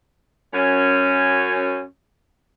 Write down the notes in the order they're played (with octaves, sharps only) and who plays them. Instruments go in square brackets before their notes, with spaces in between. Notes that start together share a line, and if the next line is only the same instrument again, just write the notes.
[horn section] F#2 C#4